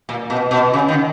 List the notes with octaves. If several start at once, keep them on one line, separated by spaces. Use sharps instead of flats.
A#2
B2
B2
C#3
D#3